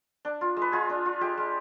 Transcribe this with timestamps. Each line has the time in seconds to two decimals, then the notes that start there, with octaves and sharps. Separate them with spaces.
0.25 D4
0.41 F4
0.57 G#3
0.62 B4
0.72 G#3 F4 G#4
0.89 D4
1.05 F4
1.21 G#3 G4
1.37 G#3